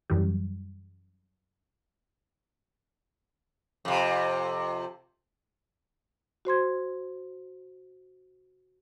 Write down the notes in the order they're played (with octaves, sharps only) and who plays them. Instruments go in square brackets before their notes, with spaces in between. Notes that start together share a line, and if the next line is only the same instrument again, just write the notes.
[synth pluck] F#2 E3 G3
[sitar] F2 C3
[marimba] F#4 C5 C6 G#6